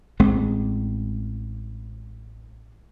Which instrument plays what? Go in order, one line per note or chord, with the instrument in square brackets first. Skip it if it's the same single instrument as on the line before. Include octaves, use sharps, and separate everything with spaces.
[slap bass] A1 G#3 C4